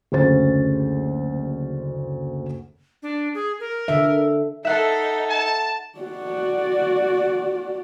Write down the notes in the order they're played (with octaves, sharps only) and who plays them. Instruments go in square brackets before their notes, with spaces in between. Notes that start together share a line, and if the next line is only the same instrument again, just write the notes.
[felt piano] F#1 D2 C#4 C5 A6
[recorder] D4
G#4
A#4
[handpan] D3 E5
[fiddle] D#4 A4 [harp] E5 F#5 C7
[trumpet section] A5
[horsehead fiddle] F#4 D5